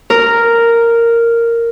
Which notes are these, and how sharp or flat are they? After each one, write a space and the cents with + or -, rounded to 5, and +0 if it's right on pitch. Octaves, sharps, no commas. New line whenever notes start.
A#4 -5